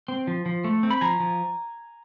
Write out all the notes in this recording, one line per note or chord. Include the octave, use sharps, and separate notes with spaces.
C4
F3
F3
A3
C4
B5
F3 G#5 A#5
F3